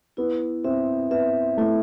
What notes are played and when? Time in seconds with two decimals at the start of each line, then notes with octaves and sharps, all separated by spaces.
0.17 B3 E4
0.64 C4 E5
1.11 B3 E5
1.57 A3 E4